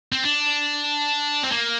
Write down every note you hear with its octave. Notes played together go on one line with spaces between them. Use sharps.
C4
D4
C4
A#3